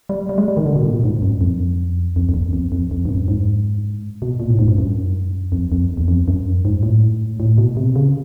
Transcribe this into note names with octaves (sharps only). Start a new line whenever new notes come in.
G3
G3
G#3
G3
D#3
D3
B2
A#2
G#2
F#2
F2
F2
F2
E2
F2
F2
F2
G2
F#2
G#2
B2
A#2
A2
G#2
G2
F#2
F2
F2
E2
F2
F#2
G#2
A2
A2
B2
C3
C#3